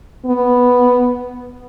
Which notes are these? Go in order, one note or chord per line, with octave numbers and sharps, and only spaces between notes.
B3